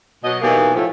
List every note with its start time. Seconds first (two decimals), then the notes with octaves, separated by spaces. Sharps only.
0.24 B2 F#3 D#5
0.42 B2 E3 F#3 A#3 D#4 G4
0.74 A2 F3